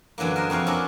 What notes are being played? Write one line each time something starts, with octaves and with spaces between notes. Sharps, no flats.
F#2 D3 E3 F#3 A#3
A#4 C5 D#5
F2 C3 F#4 A#4 F5
C#4 D4 E4 A4 A#4